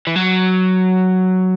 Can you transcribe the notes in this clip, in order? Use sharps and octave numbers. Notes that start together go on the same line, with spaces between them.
E3
F#3